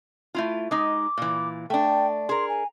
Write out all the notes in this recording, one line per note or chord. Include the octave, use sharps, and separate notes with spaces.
A3 E4 F4
G#3 D#4 D6
A#2 E3
A3 D4 G5
G#4 A#4 C6
G#5